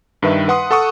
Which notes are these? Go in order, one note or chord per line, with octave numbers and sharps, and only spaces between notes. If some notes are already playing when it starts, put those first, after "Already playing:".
G2 D#3 B4 E5
B4 F#5 C6 D#6
A4 F#5 C#6 D#6